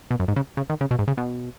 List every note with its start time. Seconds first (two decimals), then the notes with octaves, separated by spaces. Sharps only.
0.11 B2
0.20 F#2
0.28 G#2
0.36 C#3
0.57 C#3
0.70 D#3
0.81 C#3
0.91 B2
0.99 G#2
1.08 C#3
1.17 B2